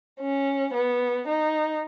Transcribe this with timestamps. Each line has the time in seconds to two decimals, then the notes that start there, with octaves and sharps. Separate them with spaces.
0.20 C#4
0.74 B3
1.28 D#4